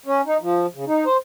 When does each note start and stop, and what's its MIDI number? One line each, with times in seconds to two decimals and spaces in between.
0.06 0.21 61
0.26 0.37 63
0.41 0.66 53
0.75 0.85 49
0.87 1.05 63
1.06 1.17 72